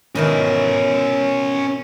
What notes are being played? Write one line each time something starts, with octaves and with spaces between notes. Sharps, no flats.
B2 D#3 E3 C#4 E5